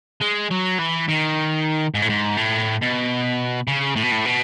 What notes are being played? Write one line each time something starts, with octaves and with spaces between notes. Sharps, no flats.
G#3
F#3
E3
D#3
G#2
A2
G#2
A2
B2
C#3
A2
B2
A2
B2